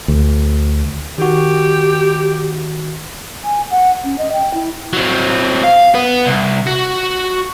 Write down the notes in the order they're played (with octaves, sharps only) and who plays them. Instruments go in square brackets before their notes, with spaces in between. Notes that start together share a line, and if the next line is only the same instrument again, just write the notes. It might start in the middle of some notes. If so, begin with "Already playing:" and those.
[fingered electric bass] D2
[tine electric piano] D#3 F#4 [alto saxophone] G4
[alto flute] G#5
F#5
C#4
D#5
G5
E4
[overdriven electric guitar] F#3 C4
F5
B3
C2
F#4